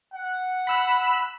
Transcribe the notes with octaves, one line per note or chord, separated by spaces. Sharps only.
F#5
B5 E6 F#6